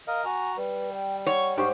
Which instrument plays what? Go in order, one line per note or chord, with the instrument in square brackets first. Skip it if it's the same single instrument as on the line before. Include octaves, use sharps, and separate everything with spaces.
[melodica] A#4 D#5 [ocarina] F5
[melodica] F#4 A#5 [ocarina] G#5
[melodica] G3 [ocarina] B4
[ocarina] G5
[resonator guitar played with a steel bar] C#5 [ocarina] F#5
[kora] G#2 G4 C5 [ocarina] C#6